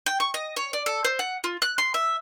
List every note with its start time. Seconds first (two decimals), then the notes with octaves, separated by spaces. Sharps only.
0.06 G5
0.20 C#6
0.34 D#5
0.56 C#5
0.73 D5
0.86 A4
1.05 C5
1.19 F#5
1.44 F4
1.62 F#6
1.78 C6
1.94 E5